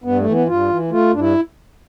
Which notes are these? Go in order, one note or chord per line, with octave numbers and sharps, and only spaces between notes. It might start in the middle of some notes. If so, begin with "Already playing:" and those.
G2 B3
A3
E3
B3
G2 F4
E3
A3 F4
G2 D4
E4